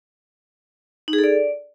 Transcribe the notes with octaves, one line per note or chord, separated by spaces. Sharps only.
D#4
G#4
A4
D5